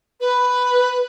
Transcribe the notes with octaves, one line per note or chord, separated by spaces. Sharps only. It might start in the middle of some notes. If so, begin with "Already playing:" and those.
B4